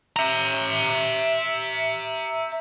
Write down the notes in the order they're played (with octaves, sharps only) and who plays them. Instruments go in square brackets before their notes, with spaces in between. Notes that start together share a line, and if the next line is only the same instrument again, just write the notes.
[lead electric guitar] E5 A#5